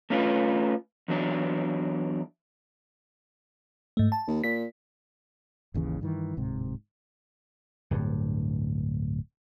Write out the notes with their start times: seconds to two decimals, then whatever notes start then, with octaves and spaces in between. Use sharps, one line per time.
0.10 A3 C#4 F4 B4
1.08 E2 F#3 D4
3.97 G#2 A3
4.12 A5
4.27 D#2
4.44 A#2 B6
5.74 G#1 D#2 C#3 E3
6.01 G2 D#3 E3
6.37 D1 G#2 C3
7.91 D1 G2